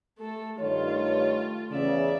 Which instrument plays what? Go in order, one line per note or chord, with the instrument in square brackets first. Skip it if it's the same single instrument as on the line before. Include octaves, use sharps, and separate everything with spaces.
[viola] A3 A4
[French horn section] G2 D#3 C#5 [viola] A3 F4
[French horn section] E2 C#3 [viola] D5 E5